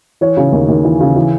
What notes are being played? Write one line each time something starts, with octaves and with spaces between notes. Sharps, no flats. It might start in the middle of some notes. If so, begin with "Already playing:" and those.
E3 C#5
C#3
D#2
D#2
E3
C#3
E3